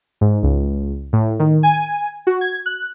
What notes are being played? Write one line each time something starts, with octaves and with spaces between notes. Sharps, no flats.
G#2
C#2
A2
D#3
G#5
F#4
G#6
F#6